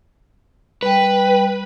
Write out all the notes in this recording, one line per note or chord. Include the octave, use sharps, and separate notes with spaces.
G3 B4 G5